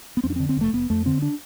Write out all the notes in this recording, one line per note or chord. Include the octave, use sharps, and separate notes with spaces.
B3
F2 C4
D4
C4
D3
C4
F1 A3
F1 B3
F2 A3
D3 C4
D4